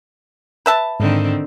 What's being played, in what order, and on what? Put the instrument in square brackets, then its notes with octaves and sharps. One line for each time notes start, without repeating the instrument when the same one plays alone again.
[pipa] B4 E5 A5
[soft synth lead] G#2 [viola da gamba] D3 D#3 C4